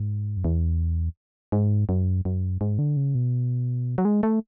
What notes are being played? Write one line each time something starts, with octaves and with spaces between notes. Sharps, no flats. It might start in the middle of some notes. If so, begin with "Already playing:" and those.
Already playing: G#2
F#2
E2
G#2
F#2
F#2
G#2
D3
C#3
B2
F#3
G#3
A3